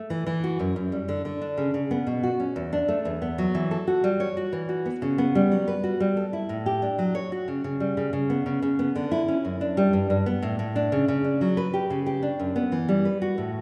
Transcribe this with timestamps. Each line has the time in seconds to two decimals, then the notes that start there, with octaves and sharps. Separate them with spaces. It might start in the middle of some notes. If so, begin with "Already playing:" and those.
Already playing: A3
0.10 E3
0.26 E3
0.44 F#4
0.60 F#2
0.76 F#2
0.92 G3
1.09 D3
1.25 D3
1.42 D4
1.58 C#3
1.74 C#3
1.91 B3
2.07 B2
2.23 F#4
2.40 C#4
2.56 E2
2.73 D4
2.88 A3
3.05 E2
3.22 B3
3.38 F#3
3.55 E3
3.71 A4
3.87 F#4
4.04 G3
4.20 C#5
4.37 F#4
4.53 E3
4.69 F#4
4.86 B3
5.02 C#3
5.18 B3
5.35 G3
5.52 F#3
5.68 B4
5.84 F#4
6.00 G3
6.17 A4
6.33 E4
6.49 A2
6.66 G4
6.82 D4
6.99 F#3
7.15 C#5
7.32 F#4
7.48 C#3
7.64 C#3
7.80 G3
7.97 C#3
8.13 C#3
8.30 B3
8.46 C#3
8.62 C#3
8.79 B3
8.96 D3
9.11 E4
9.28 C#4
9.45 F#2
9.61 D4
9.77 G3
9.93 G2
10.10 G2
10.26 B3
10.42 A2
10.59 A2
10.76 D4
10.92 C#3
11.08 C#3
11.24 D4
11.41 F#3
11.57 B4
11.74 G4
11.90 C#3
12.06 G4
12.22 D4
12.39 F#2
12.56 B3
12.72 E3
12.89 G3
13.05 B4
13.22 F#4
13.38 A2